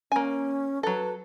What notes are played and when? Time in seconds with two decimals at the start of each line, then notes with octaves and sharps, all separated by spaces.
0.12 A#3 C#4 G#5
0.83 F#3 A4 B4